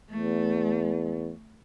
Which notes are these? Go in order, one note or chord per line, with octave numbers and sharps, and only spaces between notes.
E2 A3